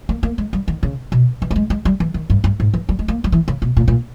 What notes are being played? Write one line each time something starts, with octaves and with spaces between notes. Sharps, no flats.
A#3
A#3
G#3
G3
D#3
C#3
B2
E3
A#3
G#3
G#3
G3
E3
D#3
G2
G2
G#2
E3
G3
G#3
A#3
G3
E3
C#3
B2
A#2
A#2